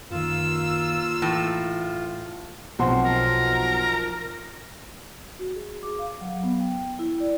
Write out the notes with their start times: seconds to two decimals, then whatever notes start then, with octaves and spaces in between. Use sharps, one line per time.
0.11 F#2 D#3 A#3 F4 E6
1.22 A2 E3 C#6
2.79 B1 F3 C4 F#4 F#5 C6
3.05 A#4
5.39 F#4
5.55 G#4
5.83 D6
5.99 F5
6.21 F#3
6.44 B3
6.60 G5
6.99 E4
7.20 D5